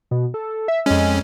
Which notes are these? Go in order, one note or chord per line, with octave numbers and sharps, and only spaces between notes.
B2
A4
E5
F2 G#3 C#4